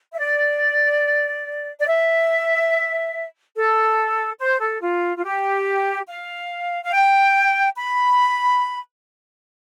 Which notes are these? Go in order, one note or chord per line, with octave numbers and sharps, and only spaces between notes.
E5
D5
D5
E5
A4
C5
A4
F4
F4
G4
F5
F5
G5
B5